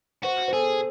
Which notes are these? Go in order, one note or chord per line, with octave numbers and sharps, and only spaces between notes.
F#4 C5
C5
G#4 A4